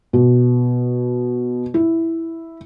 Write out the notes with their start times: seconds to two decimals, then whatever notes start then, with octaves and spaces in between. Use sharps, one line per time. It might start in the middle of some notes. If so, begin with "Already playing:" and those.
0.13 B2
1.74 E4